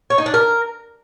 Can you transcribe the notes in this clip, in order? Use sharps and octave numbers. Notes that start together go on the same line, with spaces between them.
C#5
D#4
D4
A#4